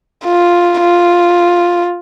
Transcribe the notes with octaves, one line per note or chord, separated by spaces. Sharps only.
F4
F4